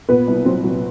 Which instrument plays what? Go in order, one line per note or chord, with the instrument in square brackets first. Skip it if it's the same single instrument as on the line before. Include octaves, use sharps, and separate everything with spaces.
[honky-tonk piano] A#2 B3 B4
C2
F#3 C4 C5
F#3